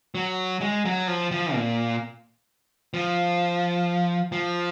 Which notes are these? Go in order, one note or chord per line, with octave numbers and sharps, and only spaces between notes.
F#3
G#3
F#3
F3
F3
A#2
F3
F3